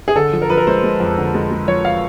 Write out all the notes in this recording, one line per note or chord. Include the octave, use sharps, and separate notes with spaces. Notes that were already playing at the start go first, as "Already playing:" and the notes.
G#4
D3 A4
F3
A#4
F3 B4
A#4
G#3 C5
G#3
F2
D3
G#3
G#3
F3 C#5
F5